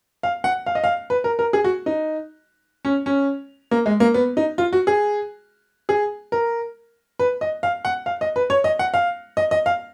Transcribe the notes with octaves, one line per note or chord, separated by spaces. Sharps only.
F5
F#5
F5
D#5
F5
B4
A#4
A#4
G#4
F#4
D#4
C#4
C#4
A#3
G#3
A#3
B3
D#4
F4
F#4
G#4
G#4
A#4
B4
D#5
F5
F#5
F5
D#5
B4
C#5
D#5
F#5
F5
D#5
D#5
F5